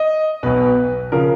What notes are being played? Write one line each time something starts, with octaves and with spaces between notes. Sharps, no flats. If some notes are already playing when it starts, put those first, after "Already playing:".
Already playing: D#5
B1 B2 B4
C#3 F3 A#4